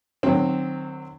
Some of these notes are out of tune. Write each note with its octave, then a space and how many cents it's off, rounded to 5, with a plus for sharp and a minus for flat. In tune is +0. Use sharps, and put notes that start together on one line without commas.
D#3 -35 F#3 +5 C4 +0